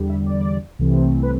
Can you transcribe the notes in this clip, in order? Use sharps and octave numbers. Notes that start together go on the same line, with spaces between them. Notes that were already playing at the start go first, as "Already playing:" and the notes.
Already playing: E2 D3 G3
E5
D5
C2 C3 E3 A3 C4
B4